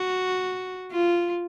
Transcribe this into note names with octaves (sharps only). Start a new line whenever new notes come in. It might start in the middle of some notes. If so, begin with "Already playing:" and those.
Already playing: F#4
F4